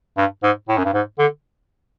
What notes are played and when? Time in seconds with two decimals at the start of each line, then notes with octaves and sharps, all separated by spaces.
0.17 G2
0.43 G#2
0.69 A2
0.78 F#2
0.85 G2
0.94 G#2
1.19 D3